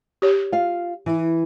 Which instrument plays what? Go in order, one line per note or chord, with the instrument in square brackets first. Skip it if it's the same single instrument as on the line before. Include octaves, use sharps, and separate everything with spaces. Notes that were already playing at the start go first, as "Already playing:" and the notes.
[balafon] G4 C#5
[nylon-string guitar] F4 F5
E3